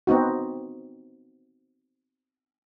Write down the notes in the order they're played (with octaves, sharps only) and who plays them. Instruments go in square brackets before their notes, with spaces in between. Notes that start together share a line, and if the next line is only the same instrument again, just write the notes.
[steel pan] B3 C4 D#4 F#4